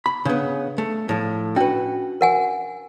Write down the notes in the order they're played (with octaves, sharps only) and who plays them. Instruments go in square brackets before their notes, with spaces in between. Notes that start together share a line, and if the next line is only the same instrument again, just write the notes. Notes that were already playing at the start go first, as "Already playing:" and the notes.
[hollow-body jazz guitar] B5
[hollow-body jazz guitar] C#3 B3 [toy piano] D4
[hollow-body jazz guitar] A3
A2 F3
[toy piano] C#4 D4 G5 [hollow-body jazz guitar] F#4 B4
[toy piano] A#4 F#5 G#5